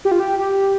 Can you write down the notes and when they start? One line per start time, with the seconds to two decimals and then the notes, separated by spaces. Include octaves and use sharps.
0.05 G4
0.11 F4
0.20 G4
0.39 G4